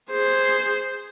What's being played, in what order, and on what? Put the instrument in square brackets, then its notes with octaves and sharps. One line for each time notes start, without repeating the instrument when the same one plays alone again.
[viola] G#4 C5